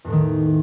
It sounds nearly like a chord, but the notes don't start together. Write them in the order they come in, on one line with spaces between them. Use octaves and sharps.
E2 A2 A3 D#3